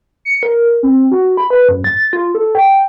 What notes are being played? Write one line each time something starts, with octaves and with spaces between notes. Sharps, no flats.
C#7
A#4
C4
F#4
B5
B4
F#2
A6
F4
A4
G5